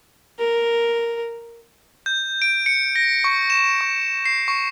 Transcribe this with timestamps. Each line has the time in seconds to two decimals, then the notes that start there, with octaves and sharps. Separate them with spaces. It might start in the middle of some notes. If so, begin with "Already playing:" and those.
0.39 A#4
2.06 G6
2.42 D7
2.66 C#7
2.96 A#6
3.24 C#6
3.50 E7
3.81 C#6
4.25 C7
4.48 C#6